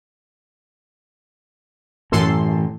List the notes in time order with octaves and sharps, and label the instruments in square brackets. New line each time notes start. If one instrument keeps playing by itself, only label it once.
[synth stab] F#2 A4 C6 [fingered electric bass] A2 E3